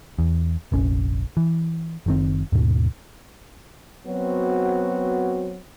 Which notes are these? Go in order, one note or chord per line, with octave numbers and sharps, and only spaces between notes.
E2
F1 A#1 C#4
E3
F#1 D#3 C4
D#2 G#2 B2
F#3 B3 C4 F#4